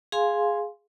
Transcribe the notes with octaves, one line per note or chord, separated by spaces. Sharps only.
G#4 F5 G#5 C6